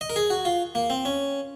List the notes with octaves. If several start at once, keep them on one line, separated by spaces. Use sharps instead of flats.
D#5
A#4
G#4
F#4
F4
A#3
C4
C#4